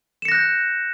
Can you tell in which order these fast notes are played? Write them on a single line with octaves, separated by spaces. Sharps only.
E7 C#7 A#6 F#6 G6